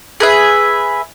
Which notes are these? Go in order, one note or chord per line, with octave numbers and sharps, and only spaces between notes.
G#4 B4 E5